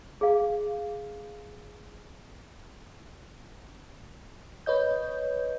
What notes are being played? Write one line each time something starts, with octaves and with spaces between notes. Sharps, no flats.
G#4 F5
B4 C#5 D#5 G6